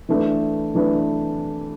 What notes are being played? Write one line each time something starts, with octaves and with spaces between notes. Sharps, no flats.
E3 A3 D4 B4
E3 A3 D4 B4